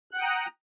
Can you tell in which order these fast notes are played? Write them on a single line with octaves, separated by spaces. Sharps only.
F#6 F#5 G5 D#6 A#5